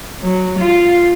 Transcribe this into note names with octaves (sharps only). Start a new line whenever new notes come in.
F#3
F4